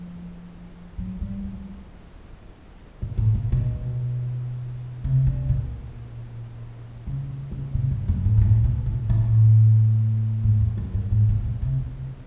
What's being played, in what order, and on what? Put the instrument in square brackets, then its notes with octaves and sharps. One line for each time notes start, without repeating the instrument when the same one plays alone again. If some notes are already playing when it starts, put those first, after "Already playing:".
Already playing: [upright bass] F3
F#3
G3
F3
A#2
A2
A#2
B2
C3
D3
A#2
C#3
C#3
C3
G2
F#2
G#2
G#2
A2
B2
A2
A2
G#2
E2
F#2
G2
G#2
A#2
B2
C3
B2